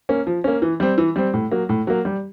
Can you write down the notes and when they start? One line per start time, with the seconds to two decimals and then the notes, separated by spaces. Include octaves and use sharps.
0.09 A#3 C#4
0.27 F3
0.44 A#3 C#4
0.62 E3
0.80 G3 C4
0.98 E3
1.16 G3 C4
1.34 A2
1.51 F#3 A#3
1.69 A2
1.87 F#3 A#3
2.05 G3